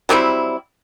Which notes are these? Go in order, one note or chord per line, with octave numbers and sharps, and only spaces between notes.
F#3 G3 C4 E4